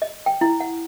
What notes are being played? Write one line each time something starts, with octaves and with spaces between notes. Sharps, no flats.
D#5
G5
E4
F#5